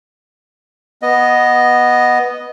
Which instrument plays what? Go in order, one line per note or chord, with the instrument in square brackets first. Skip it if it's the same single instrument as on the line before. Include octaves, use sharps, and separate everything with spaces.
[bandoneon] B3 D#5